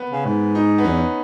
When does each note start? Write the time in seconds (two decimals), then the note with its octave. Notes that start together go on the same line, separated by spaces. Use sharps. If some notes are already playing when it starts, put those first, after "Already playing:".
Already playing: B3
0.10 C#3
0.25 G#2
0.55 D#4
0.78 B3
0.84 E2 C#4